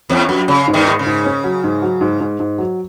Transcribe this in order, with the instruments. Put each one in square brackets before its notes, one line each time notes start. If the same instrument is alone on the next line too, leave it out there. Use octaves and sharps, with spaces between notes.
[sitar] E2 [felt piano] C#4
[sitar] F#2 [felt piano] F#3
[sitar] C#3 [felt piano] C#4
[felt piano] G#2
[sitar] D#2 D#3
[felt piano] G#2
[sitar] C#3
[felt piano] G#2
C#4
F#3
G#2
F#3
G#2
G#2
G#2
F#3